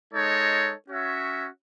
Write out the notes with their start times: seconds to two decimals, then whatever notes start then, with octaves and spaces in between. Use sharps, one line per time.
0.12 G#3 D#4 A4 C#5
0.88 C#4 F#4 C#5 E5